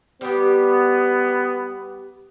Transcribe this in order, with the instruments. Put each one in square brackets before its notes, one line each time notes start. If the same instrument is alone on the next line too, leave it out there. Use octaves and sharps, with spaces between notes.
[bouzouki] G3 G4 [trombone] B3